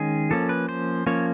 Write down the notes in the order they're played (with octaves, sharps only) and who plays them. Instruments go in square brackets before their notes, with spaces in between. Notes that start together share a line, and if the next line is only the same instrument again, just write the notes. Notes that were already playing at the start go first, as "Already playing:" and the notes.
Already playing: [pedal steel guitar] D#3 G#3 C#4 G#4
F3 A#3 C#4 A4
B4
C5
F3 A#3 C#4 C#5